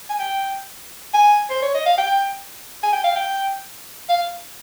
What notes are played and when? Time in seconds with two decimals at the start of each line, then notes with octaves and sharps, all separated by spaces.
0.10 G#5
0.19 G5
1.14 G#5
1.50 C5
1.62 C#5
1.74 D#5
1.86 F5
1.98 G5
2.83 G#5
2.93 G5
3.04 F5
3.16 G5
4.09 F5